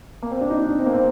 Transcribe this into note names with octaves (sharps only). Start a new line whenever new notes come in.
A#3
C4
D4
D#4
D4
C4
A#3
C4